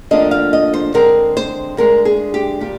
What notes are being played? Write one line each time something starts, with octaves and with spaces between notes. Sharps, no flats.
D2 D3 F3 A#3 D4 D#5
F5
D#5
C5
D3 G#3 C4 A#4
C5
D2 D3 G#3 A#4
G#4
G4
A#2 G3 G4